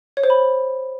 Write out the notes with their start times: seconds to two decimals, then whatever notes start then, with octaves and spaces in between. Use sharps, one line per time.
0.17 C#5
0.24 C5
0.30 B5